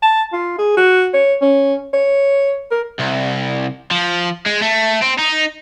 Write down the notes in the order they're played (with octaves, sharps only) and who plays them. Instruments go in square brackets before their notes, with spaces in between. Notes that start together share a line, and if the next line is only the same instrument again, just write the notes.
[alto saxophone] A5
F4
G#4
F#4
C#5
C#4
C#5
A#4
[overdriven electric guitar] C2
F3
G#3
A3
C4
D#4